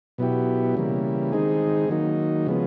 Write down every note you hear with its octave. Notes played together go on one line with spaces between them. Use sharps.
B2 F#3 B3 E4 G4
C#3 E3 G3 A#3
D#3 G#3 C4 D#4 G#4
D#3 F#3 A#3 D#4
C#3 F3 G#3 B3